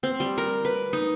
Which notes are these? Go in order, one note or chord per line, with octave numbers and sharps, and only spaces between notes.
C4
G3
A#4
B4
D#4